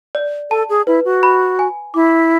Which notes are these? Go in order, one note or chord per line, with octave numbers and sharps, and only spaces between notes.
D5
A4 A5
G#4
E4 B4
F#4
B5
G#5
E4 D6